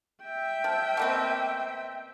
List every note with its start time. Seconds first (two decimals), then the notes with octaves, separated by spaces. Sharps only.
0.24 E5 G5
0.64 F3
0.97 B2 A#3 C4